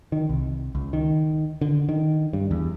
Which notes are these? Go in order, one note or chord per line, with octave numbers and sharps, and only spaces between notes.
D#3
C2
C#2
D#3
D3
D#3
G2
E2